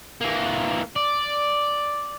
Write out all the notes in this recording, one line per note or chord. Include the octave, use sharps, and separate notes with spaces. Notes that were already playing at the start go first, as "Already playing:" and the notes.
E3 A#3
D5